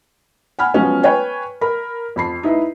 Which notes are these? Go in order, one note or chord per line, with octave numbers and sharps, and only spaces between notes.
F#5 G#5 B5 F6
F3 F#3 G#3 B3 C#4
B4 C#5 G5 G#5
A#4 B5
F2 B5 C7
D#4 E4 B4 D#5